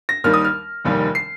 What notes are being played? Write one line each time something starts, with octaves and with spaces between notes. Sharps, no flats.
A#6
D#2 D#3 G3 F6
D#6
F6
F1 D#2 D#3 G3
C7